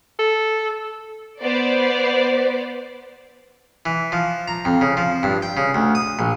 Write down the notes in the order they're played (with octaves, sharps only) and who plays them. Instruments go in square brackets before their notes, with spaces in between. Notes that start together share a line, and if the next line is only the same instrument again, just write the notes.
[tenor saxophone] A4
[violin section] B3 C5 D5
[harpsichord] E3
F3
A#5
F2
C#3
F3
G2
G5
C#3
D2
D#6
A#1